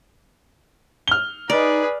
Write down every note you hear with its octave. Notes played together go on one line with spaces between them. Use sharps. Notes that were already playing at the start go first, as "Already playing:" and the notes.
F6 G7
D#4 G#4 B4 D5